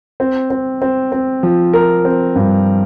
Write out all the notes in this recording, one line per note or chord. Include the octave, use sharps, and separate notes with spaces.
C4
C4
C4
C4
F3
A#4
C4
G2